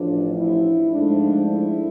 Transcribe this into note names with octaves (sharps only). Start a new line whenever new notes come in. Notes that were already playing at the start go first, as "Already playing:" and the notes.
Already playing: A1 A2 F3 D4
E4
G#2 F3 A3 D4
E4